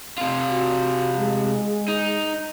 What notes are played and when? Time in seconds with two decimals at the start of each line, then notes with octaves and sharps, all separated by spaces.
0.18 C3 F4
0.48 F#4
1.17 G#3
1.88 D#4